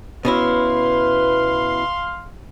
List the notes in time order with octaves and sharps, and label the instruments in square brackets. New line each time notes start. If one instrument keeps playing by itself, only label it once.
[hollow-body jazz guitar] B2 C#4 E4 [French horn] B4 [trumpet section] F5 C6